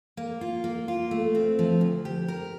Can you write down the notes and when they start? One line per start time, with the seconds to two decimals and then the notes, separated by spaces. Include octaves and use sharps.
0.17 A#3
0.41 F4
0.64 A#3
0.88 F4
1.11 A3
1.35 C4
1.59 F3
1.81 D2
2.05 G4
2.28 A#4